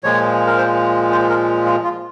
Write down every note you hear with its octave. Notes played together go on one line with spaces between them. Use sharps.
A#2 F3 G#3 C#5
A#4
C5
C5
A#4
F4
F4